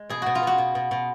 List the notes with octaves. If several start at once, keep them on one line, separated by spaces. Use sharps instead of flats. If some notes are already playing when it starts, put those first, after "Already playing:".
Already playing: G#3
B2 G#4
B2 F#4
F4
B2 F#4
B2
B2
B2